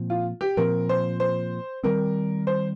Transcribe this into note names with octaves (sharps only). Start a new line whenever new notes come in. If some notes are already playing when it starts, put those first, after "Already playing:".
Already playing: A#2 F3 C4
F4
G4
A#2 F3 C4 A#4
C5
C5
D#3 G3 C4 A#4
C5